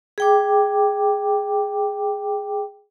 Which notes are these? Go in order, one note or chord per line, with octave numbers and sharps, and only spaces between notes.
G#4 G5 D6